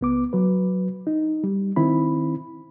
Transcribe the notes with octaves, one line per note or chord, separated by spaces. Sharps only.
C#2 B3 D6
F#3 B4
D#4
G3
D#3 C4 E4 B5